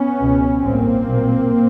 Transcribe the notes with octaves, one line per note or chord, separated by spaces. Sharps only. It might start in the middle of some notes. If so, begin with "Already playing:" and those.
Already playing: B3 C#4
C#2 B2
A1 G2 A#3 C4
B1 A#2